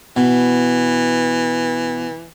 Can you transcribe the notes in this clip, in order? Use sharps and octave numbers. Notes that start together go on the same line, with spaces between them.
B2 E3